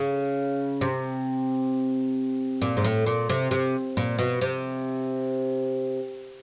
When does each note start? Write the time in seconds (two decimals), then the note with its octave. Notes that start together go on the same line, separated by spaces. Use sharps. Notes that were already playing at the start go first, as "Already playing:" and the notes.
Already playing: C#3
0.81 C3
2.62 A#2
2.77 G#2
2.84 A2
3.06 A#2
3.29 C3
3.51 C3
3.97 A#2
4.19 B2
4.41 C3